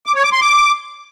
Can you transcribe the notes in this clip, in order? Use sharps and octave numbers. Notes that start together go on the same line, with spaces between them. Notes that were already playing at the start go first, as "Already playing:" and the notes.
D6
C#5
D6
C6
D6